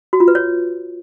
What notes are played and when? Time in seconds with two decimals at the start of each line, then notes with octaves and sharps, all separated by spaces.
0.13 F#4
0.20 F4
0.28 B4
0.35 C#5